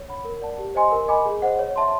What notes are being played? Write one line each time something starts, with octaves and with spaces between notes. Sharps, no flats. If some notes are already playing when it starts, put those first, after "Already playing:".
Already playing: C#5
F#5 B5
A#4
D5 F#5 A5
G4
C5 D#5 G#5 C6
A#4
D#5 G#5 B5 D6
G#4
C5 D#5 F#5
C#5
E5 A5 C6